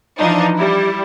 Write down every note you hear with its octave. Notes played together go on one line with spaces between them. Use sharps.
E3 F3 D4 D#4
G3 E4